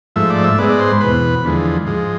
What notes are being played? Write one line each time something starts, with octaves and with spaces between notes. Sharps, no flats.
G#2 F3 A3 E5
D5
E5
G#2 G#3 B3 D5
D5
C5
E2 B2 B3 B4
E2 D3 F3 G#3
G#2 F3 G#3